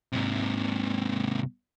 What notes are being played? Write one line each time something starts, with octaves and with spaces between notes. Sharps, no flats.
G#2 C3